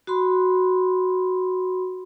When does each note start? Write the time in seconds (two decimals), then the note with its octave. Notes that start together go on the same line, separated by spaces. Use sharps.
0.07 F#4 B5 C6